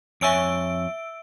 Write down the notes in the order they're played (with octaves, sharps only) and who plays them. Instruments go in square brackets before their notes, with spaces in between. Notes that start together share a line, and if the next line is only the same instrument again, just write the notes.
[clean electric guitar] F2 C#5 G#5 [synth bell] E5 E6 D7